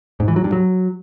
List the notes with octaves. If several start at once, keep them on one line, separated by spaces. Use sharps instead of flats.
G#2
E3
F#3
G2
F#3